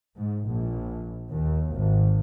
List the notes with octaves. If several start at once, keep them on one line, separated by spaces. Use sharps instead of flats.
G#2
A#1
D#2
G#1